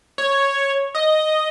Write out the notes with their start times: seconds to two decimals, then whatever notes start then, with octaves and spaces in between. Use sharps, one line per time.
0.18 C#5
0.95 D#5